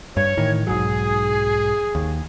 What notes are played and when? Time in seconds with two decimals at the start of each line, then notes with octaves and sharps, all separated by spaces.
0.17 G2 C#5
0.37 A2 D#3 E3
0.67 B1 G#2 F#3 G#4
1.95 D#2